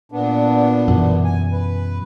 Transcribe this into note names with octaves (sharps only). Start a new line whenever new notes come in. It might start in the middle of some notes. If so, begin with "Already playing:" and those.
A#2 B3 D4
F#2 B2 E3
G#5
B4